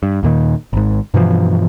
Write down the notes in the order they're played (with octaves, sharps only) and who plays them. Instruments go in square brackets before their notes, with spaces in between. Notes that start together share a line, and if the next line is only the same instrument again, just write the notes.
[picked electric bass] G2
D#2 A#2 D#3
G#1 G#2
G2 B2 E3 F3